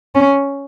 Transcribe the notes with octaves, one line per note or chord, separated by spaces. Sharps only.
C#4